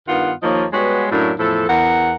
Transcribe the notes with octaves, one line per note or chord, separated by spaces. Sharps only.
G2 D#3 B3 F4 F#5
D#2 F3 A#3 D#4 C#5 D#5
G3 G#3 B3 F#4 B4 C#5
F#2 A2 F#3 A#3 D4 A#4
E2 A2 F3 A4
E2 A#4 F#5